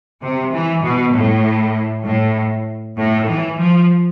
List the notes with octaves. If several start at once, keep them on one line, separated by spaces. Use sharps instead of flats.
C3
E3
B2
A2
A2
A2
E3
F3